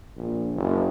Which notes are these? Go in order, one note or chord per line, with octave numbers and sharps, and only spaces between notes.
A#1
F#1